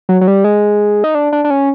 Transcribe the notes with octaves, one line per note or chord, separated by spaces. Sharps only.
F#3
F#3
G3
G#3
D#4
D4
D4
D4
C#4